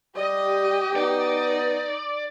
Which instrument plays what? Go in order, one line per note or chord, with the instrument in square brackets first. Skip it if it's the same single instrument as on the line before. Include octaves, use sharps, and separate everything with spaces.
[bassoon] G3 [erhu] G4 [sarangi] D#5
[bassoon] B3 [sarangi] D#4 [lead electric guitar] D5